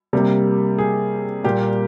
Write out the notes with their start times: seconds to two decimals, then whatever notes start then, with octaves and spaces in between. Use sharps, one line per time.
0.13 C3 G3 A#3
0.78 G#4
1.44 A#2 G3 A#3 G4